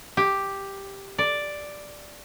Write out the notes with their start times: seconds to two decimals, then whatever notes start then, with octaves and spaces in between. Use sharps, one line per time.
0.17 G4
1.18 D5